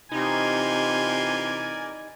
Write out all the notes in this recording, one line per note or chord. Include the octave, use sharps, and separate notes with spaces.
C3 E3 D#4 F4 A#4 D5 G#5